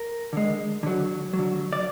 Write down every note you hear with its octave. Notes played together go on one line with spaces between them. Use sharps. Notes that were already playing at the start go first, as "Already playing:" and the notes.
Already playing: A#4
D3 G#3
D3 F#3
F#3
D3
D5